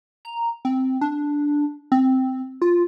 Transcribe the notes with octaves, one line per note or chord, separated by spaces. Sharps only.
A#5
C4
D4
C4
F4